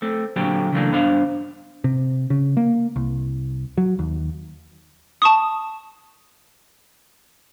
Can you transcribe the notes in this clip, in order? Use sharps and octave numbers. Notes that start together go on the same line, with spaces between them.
A3 C4
A#2 D3 F#3 C4 G4
C#3 E3 F#3 A3 A#3 D4
G2 B3 D4 C5 F5
C3
C#3
A#3
C2
F#3
D#2
A5 C#6 D#6